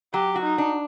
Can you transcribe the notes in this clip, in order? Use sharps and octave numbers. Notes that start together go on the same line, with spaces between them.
F#3 G4
F#4
D#4
D4